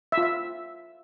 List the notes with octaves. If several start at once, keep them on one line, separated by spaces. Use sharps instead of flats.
E5
F4
E5